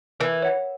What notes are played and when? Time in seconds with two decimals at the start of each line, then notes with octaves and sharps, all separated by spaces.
0.20 E3 A#4
0.42 C#5 F#5